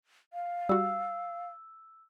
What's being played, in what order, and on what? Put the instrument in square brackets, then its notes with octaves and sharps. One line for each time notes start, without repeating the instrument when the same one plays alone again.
[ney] F5
[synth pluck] G3 F#4 [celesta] E6